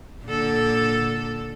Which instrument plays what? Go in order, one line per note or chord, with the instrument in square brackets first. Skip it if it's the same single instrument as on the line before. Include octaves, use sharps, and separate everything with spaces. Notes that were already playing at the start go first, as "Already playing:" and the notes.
[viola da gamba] A#2 D3 A4